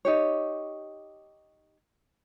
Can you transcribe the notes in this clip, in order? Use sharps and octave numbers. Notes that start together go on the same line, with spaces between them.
D#4 G4 C#5